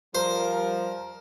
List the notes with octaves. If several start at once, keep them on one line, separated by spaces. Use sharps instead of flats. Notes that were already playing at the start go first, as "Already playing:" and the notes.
F3 G3 A#4 C5